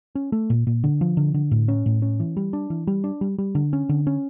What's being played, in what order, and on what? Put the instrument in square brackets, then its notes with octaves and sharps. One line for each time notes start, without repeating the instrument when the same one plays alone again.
[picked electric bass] C#4
A3
A#2
A#2
D3
F3
D3
D3
A2
C#4
A2
C#4
E3
G3
D4
E3
G3
D4
G3
G3
D3
C#4
D3
C#4